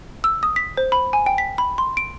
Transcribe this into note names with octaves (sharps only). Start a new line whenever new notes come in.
E6
D#6
B6
C5
B5
G#5
G5
B6
B5
C6
D7